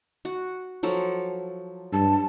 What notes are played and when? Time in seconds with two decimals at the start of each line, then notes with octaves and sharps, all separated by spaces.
0.25 F#4
0.83 F3 F#3 A4
1.93 G2 A5